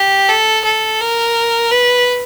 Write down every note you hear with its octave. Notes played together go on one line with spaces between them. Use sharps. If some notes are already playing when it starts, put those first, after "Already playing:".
Already playing: G4
A4
A4
A#4
B4